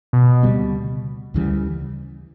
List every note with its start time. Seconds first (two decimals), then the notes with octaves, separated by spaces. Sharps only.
0.13 B2
0.43 D2 C#3 G3 B3
1.34 D2 C#3 E3 G3